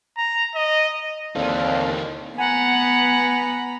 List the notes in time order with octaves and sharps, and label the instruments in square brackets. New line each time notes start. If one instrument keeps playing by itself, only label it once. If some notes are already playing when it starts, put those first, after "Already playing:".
[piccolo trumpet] A#5
D#5
[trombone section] D#2 [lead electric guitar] E3 D#4 [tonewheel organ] C4 A4 F5 [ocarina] D5
[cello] B3 [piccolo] F#5 [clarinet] G#5 [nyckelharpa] A#5 B5